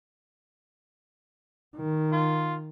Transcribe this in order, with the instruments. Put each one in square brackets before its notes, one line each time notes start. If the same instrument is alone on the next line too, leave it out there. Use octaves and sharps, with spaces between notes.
[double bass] D#3
[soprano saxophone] F4